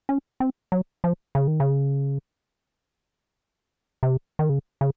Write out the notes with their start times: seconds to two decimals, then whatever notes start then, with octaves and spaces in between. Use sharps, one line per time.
0.09 C#4
0.40 C4
0.72 F#3
1.04 F3
1.35 C#3
1.48 D#3
1.60 C#3
4.03 C3
4.39 D#3
4.49 C#3
4.81 C#3